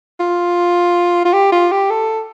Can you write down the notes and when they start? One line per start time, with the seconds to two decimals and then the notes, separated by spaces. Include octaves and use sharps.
0.20 F4
1.25 F4
1.33 G4
1.52 F4
1.72 G4
1.90 A4